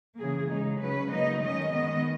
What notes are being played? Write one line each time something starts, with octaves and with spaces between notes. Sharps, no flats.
C#3 E3 A#3 G#4
C#3 G#3 D#4
C#3 F#3 C#4 B4
C#3 F#3 A#3 D#4 D#5
D#3 G#3 C#4 D#5
D#3 G#3 B3 D#5